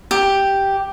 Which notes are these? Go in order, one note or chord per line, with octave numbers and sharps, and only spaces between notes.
G4